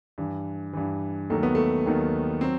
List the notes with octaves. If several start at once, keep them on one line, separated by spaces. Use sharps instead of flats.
G2 E3
G2 E3
D#2 D#3 F#3 A3
B3
A3
D#2 D#3 F#3
F#3 C4